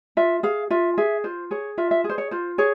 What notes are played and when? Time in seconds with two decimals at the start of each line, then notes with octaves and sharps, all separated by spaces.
0.17 F4 E5
0.43 G#4 F5
0.70 F4 E5
0.98 G#4 E5
1.24 F4 C5
1.51 G#4 C#5
1.78 F4 E5
1.91 E5
2.04 G#4
2.09 C5
2.18 C#5
2.31 F4 C5
2.58 G#4 C#5